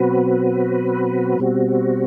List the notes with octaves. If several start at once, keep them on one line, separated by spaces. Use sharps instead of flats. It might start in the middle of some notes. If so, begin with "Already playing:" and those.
Already playing: B2 F#3 C4 F#4 B4
B2 G3 C4 F#4